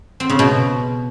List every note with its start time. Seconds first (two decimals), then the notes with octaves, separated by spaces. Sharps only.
0.20 C4
0.30 C#3
0.39 B2